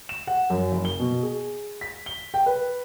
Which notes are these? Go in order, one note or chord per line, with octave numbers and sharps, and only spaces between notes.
E7
F#5
F#2
F#1
G7
B2
G#4
B6
G7
G5
B4